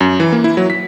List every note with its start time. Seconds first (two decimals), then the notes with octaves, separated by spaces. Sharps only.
0.01 F#2
0.20 E3
0.33 A#3
0.44 E4
0.57 F#3
0.70 B6